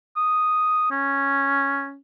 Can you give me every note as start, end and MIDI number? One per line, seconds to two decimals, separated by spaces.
0.16 0.90 87
0.91 1.97 61